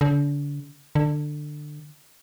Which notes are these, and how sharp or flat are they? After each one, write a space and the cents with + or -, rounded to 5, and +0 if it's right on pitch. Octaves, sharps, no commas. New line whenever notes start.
D3 -35
D3 +20